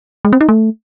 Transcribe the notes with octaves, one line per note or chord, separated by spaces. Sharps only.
G#3
C4
D#4
A3